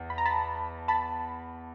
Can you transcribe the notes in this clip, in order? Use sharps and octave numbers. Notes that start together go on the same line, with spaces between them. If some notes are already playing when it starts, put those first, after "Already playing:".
Already playing: E2
B5
A#5
A5 B5
A5 B5